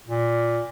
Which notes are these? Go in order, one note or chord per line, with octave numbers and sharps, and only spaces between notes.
A#2